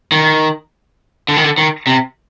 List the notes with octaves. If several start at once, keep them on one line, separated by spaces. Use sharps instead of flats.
D#3
D3
D#3
D3
D#3
C3